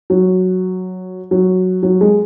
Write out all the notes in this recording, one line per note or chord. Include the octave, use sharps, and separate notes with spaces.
F#3
F#3
F#3
G#3